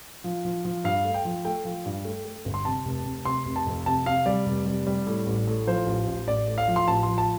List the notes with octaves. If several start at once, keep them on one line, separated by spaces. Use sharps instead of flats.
F3
F3
F3
G2 F5
A3
G5
F3
A3 G5
F3
G2
A3
A3
G1
C6
C3 A5
F1
F1
C3 C6
F1
A5
F2
C3 A5
C3 F5
G3 D5
F1
G3
G3
A2
A1
A2
F3 C5
A1
A1
A1 D5
A2
F5
F3
C6
A1 A5
F3 C6
A5